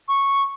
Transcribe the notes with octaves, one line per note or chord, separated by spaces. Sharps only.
C#6